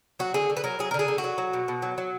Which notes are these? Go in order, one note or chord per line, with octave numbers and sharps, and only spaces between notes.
F#3 F#4
D3 G#4
D3
B4
F#3 A#4
F#3 G#4
A#4
D3
G#4
D3
F#4
F#3
F#3
B2
B2
F#3
F#3